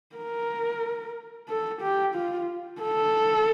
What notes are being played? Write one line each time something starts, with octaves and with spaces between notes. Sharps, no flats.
A#4
A4
G4
F4
A4